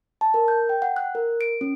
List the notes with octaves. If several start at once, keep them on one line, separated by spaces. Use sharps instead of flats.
A5
A#4
G6
G5
F#5
F#6
A#4
D7
C#4